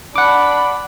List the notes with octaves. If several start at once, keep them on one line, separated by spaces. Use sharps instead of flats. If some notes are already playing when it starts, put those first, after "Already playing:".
D4 F#5 B5 D6